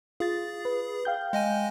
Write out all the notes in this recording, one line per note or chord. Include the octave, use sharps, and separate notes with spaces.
F4 G#4 A6
B4
F5 G5 G6
G#3 D#5 G#5